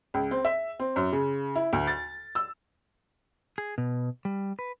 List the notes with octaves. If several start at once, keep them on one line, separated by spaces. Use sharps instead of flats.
C#2
C4
E5
C4
F#2
C#3
E4
D2
A6
E6
G#4
B2
G3
B4